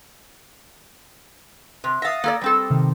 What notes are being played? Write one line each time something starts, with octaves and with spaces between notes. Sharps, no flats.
C3
E5 F5 D#6 A6 A#6
A#3 A4 D5
G3 C4 A4
C3 D#3